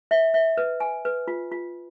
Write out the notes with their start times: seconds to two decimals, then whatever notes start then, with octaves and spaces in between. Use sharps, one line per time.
0.11 E5
0.34 E5
0.57 B4
0.80 G#5
1.05 B4
1.28 F4
1.52 F4